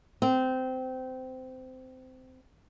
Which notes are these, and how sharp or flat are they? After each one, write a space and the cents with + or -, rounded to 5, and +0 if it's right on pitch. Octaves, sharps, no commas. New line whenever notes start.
C4 -20